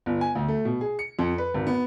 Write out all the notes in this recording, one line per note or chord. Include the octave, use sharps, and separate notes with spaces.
G1
G#5
D2
A3
B2
G#4
C#7
F2
B4
G#1
B3